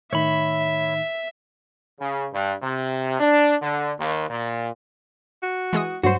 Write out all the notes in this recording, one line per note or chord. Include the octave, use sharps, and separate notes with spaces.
A2 D#3 D#4 C#5 E5 B5
C#3
G2
C3
D4
D3
D#2
A#2
F#4
E3 G#3 D#6
G2 F#3 F#4 C5